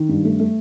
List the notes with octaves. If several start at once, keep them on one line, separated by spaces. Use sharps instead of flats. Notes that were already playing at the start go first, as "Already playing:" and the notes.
Already playing: D#3
G2
A3
A3